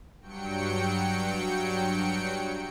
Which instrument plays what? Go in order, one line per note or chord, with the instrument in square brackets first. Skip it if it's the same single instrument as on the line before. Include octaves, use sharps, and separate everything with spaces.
[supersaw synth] G2 F#3 G5 C#7